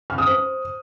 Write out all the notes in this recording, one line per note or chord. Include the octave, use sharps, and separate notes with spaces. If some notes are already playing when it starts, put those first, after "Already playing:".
F6
D#6
C5